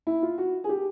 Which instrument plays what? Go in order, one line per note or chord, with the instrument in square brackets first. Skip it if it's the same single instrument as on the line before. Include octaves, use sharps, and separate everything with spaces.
[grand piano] E4
F4
F#4
G#4
G4